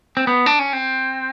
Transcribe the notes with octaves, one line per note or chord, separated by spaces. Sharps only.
C4
B3
D4
C#4
C4